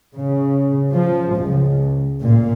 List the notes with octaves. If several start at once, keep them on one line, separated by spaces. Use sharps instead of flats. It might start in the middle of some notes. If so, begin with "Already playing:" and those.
C#3
F3
C#2
A#2